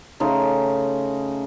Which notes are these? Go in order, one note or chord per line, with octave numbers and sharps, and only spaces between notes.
C#3 A3 D#4 C6